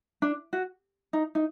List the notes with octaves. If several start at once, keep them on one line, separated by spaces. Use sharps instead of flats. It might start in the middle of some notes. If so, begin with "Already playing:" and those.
D4
F#4
D#4
D#4